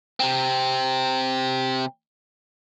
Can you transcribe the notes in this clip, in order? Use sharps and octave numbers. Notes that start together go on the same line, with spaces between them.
C3 C4